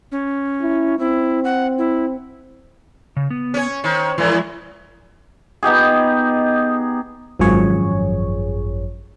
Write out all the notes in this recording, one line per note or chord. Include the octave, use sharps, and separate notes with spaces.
C#4
E4
C4 E4
F#5
E4
C#3
B3
C#4 C#5
D#3 C5 C#5
A2 E3 F3 G#3 E4
B3 D#4 G4 G#4
G#1 F#2 F3 G#4 C#5